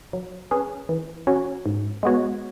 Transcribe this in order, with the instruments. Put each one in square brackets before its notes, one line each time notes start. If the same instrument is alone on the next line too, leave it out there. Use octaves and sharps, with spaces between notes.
[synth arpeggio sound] F#3
C#4 G#4 B4
E3
C#4 F#4 C#5
G#2
G#3 B3 F#4 C#5